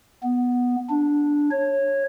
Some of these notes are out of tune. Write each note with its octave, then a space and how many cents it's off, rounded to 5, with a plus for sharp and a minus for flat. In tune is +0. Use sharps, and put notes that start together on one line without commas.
B3 -5
D4 -5
C#5 -15